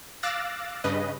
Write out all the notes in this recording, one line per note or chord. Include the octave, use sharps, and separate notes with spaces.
F5 D6 E6 F#6 A6 A#6
G2 C#3 B4 D#5